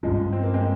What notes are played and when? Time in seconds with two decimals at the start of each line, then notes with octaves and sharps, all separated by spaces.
0.03 G2 F3 G3 G#3 C#4
0.33 C4
0.43 A#3
0.54 G#3 C4